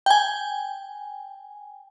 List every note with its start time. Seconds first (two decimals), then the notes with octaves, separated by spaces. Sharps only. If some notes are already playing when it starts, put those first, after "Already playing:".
0.06 G5 G#5